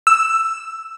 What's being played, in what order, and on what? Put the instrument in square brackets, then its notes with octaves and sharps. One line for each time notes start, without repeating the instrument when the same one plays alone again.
[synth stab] E6